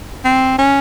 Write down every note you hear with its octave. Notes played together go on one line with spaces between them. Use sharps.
C4
C#4